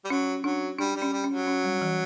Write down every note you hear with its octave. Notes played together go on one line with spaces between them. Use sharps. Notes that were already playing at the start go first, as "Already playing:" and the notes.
G3
F#3 C#4
F#3 D4
G3 D4
G3
C#4
G3
C#4
F#3
C#4
G3
E3